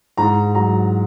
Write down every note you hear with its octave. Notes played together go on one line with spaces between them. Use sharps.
G#2 A#5
F#3 A#5